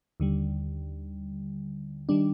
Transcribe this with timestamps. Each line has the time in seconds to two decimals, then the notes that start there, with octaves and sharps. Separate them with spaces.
0.20 D#2 D3 G3
2.09 D#3 G3 D4